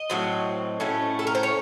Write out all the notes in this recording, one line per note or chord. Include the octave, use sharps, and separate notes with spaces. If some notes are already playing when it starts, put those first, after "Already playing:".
Already playing: D#5
A2 F#3 C4
A2 A3 C#4
A4
A#4
C5
C#5